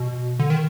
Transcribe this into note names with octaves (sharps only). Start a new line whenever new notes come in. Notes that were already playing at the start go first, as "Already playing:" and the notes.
Already playing: B2
D3
D#3